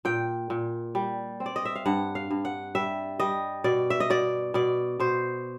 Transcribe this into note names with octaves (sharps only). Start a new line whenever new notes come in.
A#2 G5
A#2
G3
C4
D5
D#5
E5
F5
G2 F#5
F5
G2
F#5
G3 E5
G3 D#5
B2 D5
E5
D#5
B2 D5
B2 D5
B2 C5